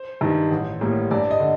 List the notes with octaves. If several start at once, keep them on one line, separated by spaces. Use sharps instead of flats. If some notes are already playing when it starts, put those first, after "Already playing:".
Already playing: C5
G2 D#3 G3
A1
A2 G3 A#3
G2 D5
D#5
D3